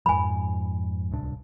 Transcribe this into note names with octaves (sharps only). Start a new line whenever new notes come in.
F2 G#2 F3 G#5 B5
D1 C2 D4